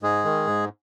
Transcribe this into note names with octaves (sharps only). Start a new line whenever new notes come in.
G#2 G#3 G#4
D#3
G#2